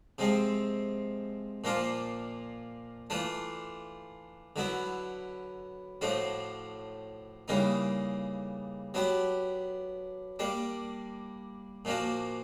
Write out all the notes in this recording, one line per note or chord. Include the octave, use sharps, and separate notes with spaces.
C3 F3 G#3 C4
A#2 F3 A#3 D4 F4
E3 A3 D4 F4
D3 F#3 B3 E4
A2 F3 A3 D4 F#4
C#3 E3 G3 A#3 D#4
F#3 B3 D4 G4
G3 A#3 D4
A#2 F3 A#3 D4 F#4